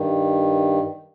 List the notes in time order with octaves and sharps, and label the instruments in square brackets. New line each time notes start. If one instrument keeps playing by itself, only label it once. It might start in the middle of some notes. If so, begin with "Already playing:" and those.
Already playing: [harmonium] G2 D#3